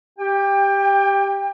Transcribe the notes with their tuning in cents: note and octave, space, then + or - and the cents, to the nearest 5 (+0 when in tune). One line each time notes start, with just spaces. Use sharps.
G4 +0 G5 +25